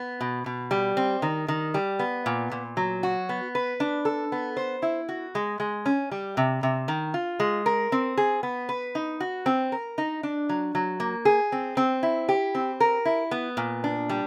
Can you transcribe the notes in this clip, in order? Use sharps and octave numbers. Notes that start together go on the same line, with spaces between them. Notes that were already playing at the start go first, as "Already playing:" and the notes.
Already playing: B3
B2
B2
G3
C4
D#3
D#3
G3
B3
A#2
A#2
F#3
F#4
B3
B4
D4
A4
B3
C5
E4
F#4
G#3
G#3
C#4
G3
C3
C3
D#3
F4
G#3
A#4
C4
G#4
B3
B4
D#4
F#4
C4
A#4
D#4
D4
F#3
F#3
A#3
G#4
C4
C4
E4
G4
C4
A#4
E4
B3
A#2
D4
G3